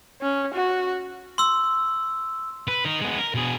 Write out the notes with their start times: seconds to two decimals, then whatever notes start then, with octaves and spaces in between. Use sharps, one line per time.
0.21 C#4
0.54 F#4
1.38 C6 E6
2.68 B4
2.85 D#4 A#4
3.01 G#3 B3
3.18 A#4
3.35 B2 G#4